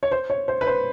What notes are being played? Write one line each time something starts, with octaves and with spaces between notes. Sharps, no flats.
C#5
C5
C#5
C5
B4
C5